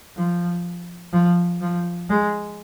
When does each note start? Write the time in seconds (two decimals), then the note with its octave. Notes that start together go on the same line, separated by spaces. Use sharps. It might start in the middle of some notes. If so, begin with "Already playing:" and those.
0.16 F3
1.13 F3
1.61 F3
2.09 G#3